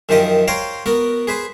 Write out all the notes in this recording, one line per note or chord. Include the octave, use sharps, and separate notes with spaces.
F#2 D#3 F3 G4 D#5 D#6
C5 C#5 F5 G5 A#5
B3 F#4 A#4
G#4 B4 C5